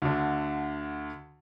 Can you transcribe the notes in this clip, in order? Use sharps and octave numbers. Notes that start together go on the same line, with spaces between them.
D2 D3